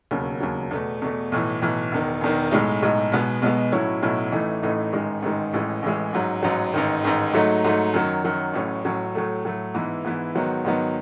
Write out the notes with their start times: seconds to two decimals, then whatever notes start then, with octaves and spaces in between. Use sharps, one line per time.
0.11 E1 D#2 C#3 F#3
0.40 E1 D#2 C#3 F#3
0.71 E2 B2 A3
1.02 E2 B2 A3
1.32 B1 A2 E3
1.61 B1 A2 E3
1.92 E1 E2 D#3
2.21 E1 E2 D#3
2.51 B1 A2 G#3 D#4
2.82 B1 A2 G#3 D#4
3.12 B1 B2 G#3 B3
3.42 B1 B2 G#3 B3
3.72 B1 A2 F#3 C#4 E4
4.02 B1 A2 F#3 C#4 E4
4.32 A1 A2 E3 A3 D#4
4.62 A1 A2 E3 A3 D#4
4.93 A1 G#2 D#3 G#3
5.22 A1 G#2 D#3 G#3
5.53 A1 A2 E3 G#3
5.82 A1 A2 E3 G#3
6.13 A1 G#2 F#3
6.43 A1 G#2 F#3
6.74 A1 G#2 D#3
7.04 A1 G#2 D#3
7.33 G#2 F#3 A3 D#4
7.64 G#2 F#3 A3 D#4
7.94 F#2 D#3 F#3
8.24 F#2 D#3 F#3
8.53 A1 A2 F#3 C#4
8.84 A1 A2 F#3 C#4
9.15 A2 F#3 A3
9.45 A2 F#3 A3
9.74 G#2 E3 B3 E4
10.04 G#2 E3 B3 E4
10.35 G#2 D#3 F#3 B3
10.65 G#2 D#3 F#3 B3